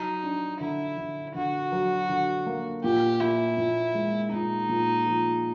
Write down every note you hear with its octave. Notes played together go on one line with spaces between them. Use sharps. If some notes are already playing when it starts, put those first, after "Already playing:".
Already playing: F#3 D#4
D4
D3 E4
D3
D3 F#4
F#3
D3
A#3
A#2 G4
A#2 E4
A#2
G#3
A#2 D#4
A#2
F3